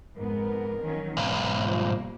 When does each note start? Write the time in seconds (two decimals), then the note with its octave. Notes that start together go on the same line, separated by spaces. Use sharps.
0.18 F2 G#2 B3 A#4
0.82 D#3 F#3 C#4
1.17 B1 G#2 B3
1.66 F3 G3 A#3